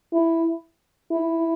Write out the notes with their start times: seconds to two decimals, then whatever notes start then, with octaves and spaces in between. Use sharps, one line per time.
0.14 E4
1.12 E4